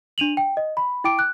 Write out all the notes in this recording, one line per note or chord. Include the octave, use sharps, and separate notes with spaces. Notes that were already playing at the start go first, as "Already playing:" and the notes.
D4 D#7 F7 F#7
G5
D#5
B5
E4 G5 D6 D7
F#6